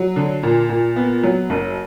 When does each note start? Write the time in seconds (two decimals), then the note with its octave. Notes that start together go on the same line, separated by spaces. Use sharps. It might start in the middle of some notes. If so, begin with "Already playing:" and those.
Already playing: F#3
0.16 D3
0.43 A#2
0.69 A#2
0.96 B3
1.23 F#3
1.50 F#1